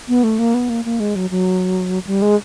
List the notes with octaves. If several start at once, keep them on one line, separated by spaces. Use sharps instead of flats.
B3
A3
A#3
B3
A#3
A#3
G#3
F#3
F#3
G3
G#3